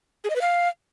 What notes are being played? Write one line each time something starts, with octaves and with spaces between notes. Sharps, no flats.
G#4
D#5
B4
F5